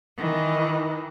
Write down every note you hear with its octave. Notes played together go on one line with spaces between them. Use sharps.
D#3 E3